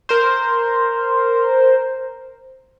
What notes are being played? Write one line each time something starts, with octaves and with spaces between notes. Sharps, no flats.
A#4 C5